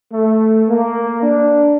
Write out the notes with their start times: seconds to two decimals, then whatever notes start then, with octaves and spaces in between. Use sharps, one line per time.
0.12 A3
0.68 A#3
1.22 D4